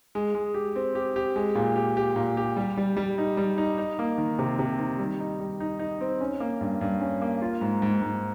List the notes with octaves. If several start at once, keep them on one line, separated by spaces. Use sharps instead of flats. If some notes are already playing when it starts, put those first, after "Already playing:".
G#3
G#3
G4
C4
G4
G4
G#3
A#2
G4
G4
A#2
G4
G3
G3
G3
D#4
G3
D#4
D#4
A#3
D#3
C3
C3
D#3
G3
D#4
G3
D#4
D#4
C4
C#4
A#3
G2
G2
C#4
A#3
F4
G#2
G#2
G#2